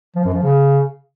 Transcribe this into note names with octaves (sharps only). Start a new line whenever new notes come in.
F3
F#2
F3
C#3